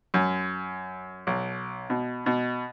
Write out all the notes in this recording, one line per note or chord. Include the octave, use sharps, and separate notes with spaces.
F#2
B1
B2
B2